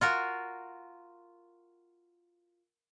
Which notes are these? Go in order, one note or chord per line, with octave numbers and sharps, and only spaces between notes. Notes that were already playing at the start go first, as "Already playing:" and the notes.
F4 F#4 A#4